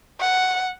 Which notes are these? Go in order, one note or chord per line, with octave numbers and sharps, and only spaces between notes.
F#5